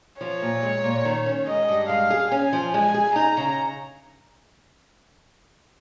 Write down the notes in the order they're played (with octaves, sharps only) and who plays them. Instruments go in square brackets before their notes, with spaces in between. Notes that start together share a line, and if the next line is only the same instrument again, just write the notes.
[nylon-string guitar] F3 [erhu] C#5
[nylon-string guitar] A#2
G#3
A#2
D#3
C#4
[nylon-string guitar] G#3 [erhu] D#5
[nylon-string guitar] G2
[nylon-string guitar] G#3 [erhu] F5
[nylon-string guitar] G#4
[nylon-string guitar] C#4 [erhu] G#5
[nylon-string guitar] F3
[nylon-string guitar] G#3 [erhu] G#5
[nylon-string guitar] G#4
[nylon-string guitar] D#4 [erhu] A#5
[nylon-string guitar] C#3